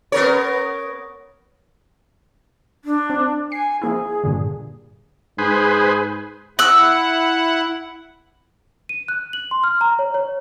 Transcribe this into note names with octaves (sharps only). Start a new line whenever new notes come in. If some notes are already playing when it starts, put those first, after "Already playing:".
B3 A#4 C#5
D4
C4
G#5 C7
F3 A#3 E4 G#4
G2 A#2 D3
G#2 G#4 B4 C5
E4 F#5 E6 F#6
D#7
F#6
F#7
C6
F6
A#5
C#5
C#5